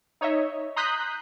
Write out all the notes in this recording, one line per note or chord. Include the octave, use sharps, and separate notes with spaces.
D#4 C#5 D#5 E5
A#5 C6 D#6 F#6 G6 B6